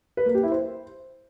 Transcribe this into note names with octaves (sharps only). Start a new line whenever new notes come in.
B4
A#3
G4
E4
C5